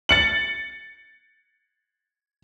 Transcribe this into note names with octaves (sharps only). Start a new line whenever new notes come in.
A6 C#7 F#7